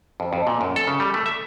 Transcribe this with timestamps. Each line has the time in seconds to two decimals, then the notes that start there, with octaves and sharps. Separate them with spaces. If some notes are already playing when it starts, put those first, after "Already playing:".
0.20 F2
0.33 F2
0.47 A#2
0.61 F#2
0.76 A4
0.87 C#3
1.00 G3
1.14 A3
1.26 E5